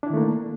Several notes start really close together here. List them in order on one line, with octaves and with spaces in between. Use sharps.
D4 E4 D#3 A3 A#3